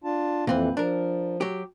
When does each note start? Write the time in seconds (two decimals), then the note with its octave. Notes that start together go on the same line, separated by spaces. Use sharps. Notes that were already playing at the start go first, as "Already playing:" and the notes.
0.04 D4 F4 A5
0.47 F2 A#2 E3 C4 B4
0.77 F3 D4 A#4
1.41 F#3 G4